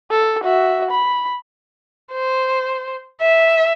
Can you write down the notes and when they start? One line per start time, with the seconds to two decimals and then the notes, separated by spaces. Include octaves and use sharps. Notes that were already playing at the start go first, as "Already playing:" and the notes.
0.10 A4
0.44 F#4 E5
0.91 B5
2.12 C5
3.21 E5